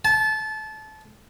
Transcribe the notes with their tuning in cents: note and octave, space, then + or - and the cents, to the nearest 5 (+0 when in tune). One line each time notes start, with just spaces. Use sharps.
A5 -25